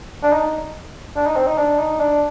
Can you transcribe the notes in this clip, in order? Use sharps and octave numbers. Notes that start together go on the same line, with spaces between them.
D4
D#4
D4
D#4
C4
D#4
D4
D#4
D4